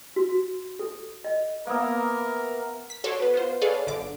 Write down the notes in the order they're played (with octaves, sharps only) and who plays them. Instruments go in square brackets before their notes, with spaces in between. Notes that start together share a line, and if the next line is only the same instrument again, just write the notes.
[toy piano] F#4
A4
D#5
[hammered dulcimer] A#3 B3 E5 [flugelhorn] A#4
[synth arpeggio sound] B6
F#4 A4 C#5 C6 D6 E6
B3 B4
B3 F4 C5
G#4 A4 B4 C#5 D5 F5
G1 D3 D6